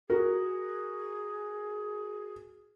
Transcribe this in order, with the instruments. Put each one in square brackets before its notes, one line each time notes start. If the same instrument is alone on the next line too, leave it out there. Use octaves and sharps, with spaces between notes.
[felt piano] F#4 A#4 [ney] G#4